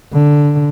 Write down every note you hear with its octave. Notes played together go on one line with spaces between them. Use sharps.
D3